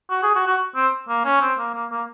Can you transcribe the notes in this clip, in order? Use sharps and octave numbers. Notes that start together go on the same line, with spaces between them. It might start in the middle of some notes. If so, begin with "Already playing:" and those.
F#4
G#4
F#4
F#4
C4
A#3
C#4
C4
A#3
A#3
A#3